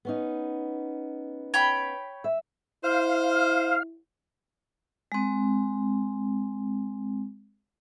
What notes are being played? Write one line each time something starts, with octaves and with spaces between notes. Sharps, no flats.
B3 C#4 D#4
C#5 G5 B5
E5
E4 C5 F5
G#3 C4